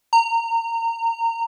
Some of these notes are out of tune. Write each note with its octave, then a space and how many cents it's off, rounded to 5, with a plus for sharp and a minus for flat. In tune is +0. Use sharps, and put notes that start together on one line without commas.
A#5 -25